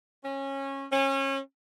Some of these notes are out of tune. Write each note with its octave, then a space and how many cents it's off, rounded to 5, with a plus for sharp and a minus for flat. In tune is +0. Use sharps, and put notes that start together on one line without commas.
C#4 -20
C#4 -30